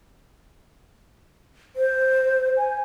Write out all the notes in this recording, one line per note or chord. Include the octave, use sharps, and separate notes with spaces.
C5
G#5